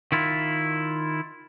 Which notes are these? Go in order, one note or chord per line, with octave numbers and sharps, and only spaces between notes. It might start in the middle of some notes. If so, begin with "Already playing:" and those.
D#3 E4 F4